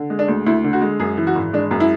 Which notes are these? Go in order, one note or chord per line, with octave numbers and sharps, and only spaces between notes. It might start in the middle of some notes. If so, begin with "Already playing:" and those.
Already playing: D3
G#3
D4
D2
D2 E4
D3
F#4
G#3
F#2 G#4
E3
F#4
G#1
G#3 D4
F#2
E4